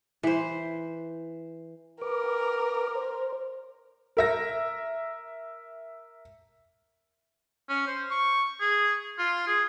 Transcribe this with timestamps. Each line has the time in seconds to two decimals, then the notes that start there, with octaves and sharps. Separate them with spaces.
0.23 E3 C5
2.01 A#4 B4 D6
2.95 C5
4.17 A#4 E5 A#6
7.69 C#4
7.87 C5
8.11 C#6
8.61 G#4
9.18 F4
9.47 G#4